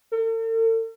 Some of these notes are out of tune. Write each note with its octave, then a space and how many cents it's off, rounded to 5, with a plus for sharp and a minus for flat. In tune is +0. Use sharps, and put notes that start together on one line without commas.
A4 +45